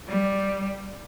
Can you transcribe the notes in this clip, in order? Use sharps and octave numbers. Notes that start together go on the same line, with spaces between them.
G3